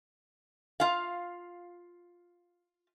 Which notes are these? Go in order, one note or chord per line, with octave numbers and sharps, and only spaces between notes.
F4 F5